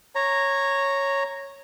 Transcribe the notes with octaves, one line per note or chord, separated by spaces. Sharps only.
C#5 A#5